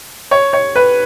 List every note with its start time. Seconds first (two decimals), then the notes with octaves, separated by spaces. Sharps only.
0.31 C#5
0.53 C#5
0.76 B4